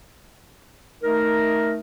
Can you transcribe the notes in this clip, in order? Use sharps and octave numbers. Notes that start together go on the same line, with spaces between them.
A3 D#4 A#4